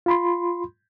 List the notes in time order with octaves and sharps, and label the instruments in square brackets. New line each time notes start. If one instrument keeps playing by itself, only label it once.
[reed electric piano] F4 B5 C6